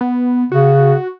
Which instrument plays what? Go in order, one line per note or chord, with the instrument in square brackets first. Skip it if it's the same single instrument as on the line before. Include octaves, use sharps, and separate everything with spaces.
[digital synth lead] B3
[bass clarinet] C#3 [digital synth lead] F#4